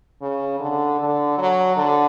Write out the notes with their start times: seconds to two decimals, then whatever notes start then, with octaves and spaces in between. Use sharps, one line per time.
0.22 C#3
0.60 D3
0.99 D3
1.38 F#3
1.77 D3